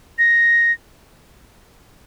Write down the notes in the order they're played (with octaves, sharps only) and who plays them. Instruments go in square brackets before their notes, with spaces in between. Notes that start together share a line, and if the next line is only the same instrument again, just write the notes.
[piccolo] A#6